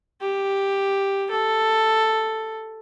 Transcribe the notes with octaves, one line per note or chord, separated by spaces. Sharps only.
G4
A4